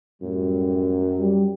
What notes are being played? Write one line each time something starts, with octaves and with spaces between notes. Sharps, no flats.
F#2 A2 G3
G3